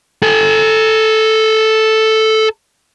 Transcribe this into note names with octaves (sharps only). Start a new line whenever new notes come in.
A4 G#5